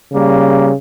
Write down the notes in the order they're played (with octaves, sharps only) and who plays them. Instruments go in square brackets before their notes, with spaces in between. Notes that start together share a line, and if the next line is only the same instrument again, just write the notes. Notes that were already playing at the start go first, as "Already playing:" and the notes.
[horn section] C#3 G3 A#3